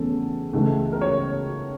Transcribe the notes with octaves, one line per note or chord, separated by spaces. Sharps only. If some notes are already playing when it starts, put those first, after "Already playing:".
Already playing: E2 C#3 E3 A3 C#4 A4
C#2 C#3 E3 A3
A#4
C#5